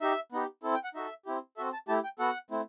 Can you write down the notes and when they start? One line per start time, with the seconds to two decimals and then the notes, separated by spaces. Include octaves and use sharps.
0.01 D#4 G4 E5
0.32 B3 D#4 G4
0.63 C4 E4 A4
0.74 G5
0.84 F#5
0.95 D#4 F#4 A4 E5
1.26 C4 E4 G4
1.57 C4 F#4 A4 E5
1.73 A5
1.88 A3 E4 G4 A5
2.04 G5
2.19 B3 F#4 A4 F#5
2.51 A3 C4 E4